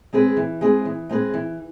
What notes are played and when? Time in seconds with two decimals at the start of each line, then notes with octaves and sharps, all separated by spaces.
0.13 G#3 C4 G#4 B4
0.37 E3
0.61 G#3 C4 G#4 B4
0.85 E3
1.09 G#3 C4 G#4 B4
1.34 E3